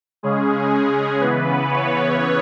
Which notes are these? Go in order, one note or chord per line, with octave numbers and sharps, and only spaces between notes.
C#3 G#3 C#4 G#4
G#4
C#3 E3 B3 B4
C#5